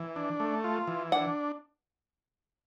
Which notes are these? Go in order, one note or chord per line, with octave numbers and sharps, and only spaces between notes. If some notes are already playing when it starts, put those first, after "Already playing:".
Already playing: E3
D4
A3
F4
E3
D4 F#5